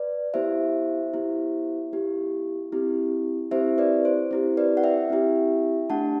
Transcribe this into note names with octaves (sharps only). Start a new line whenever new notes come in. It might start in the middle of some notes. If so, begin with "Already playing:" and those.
Already playing: B4 D5
B3 E4 G4 C5 E5
B3 E4 G4
B3 E4 G4
C4 E4 G4
C4 E4 G4 C5 E5
B4 D5
C5
C4 E4 G4 C5
B4 D5
F#5
E5 G5
C4 E4 G4
A3 D4 G4 F#5 A5